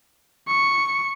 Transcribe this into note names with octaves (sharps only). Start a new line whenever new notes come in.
C#6